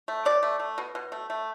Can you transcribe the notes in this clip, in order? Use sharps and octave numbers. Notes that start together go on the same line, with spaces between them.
A3
B2 D5
A3
A3
B2
B2
A3
A3